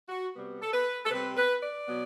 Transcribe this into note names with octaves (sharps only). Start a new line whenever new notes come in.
F#4
C3 G3 B3
A4
B4
A4
C3 G3 C4 B4
B4
D5
B2 F#3 B3